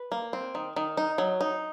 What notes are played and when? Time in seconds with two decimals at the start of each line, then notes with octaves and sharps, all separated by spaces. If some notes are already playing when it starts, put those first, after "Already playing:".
Already playing: B4
0.12 A#3
0.33 C4
0.55 D#3
0.76 D#3
0.97 D#4
1.18 F#3
1.41 D#4